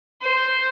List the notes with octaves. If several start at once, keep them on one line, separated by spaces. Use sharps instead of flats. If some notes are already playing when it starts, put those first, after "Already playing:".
C5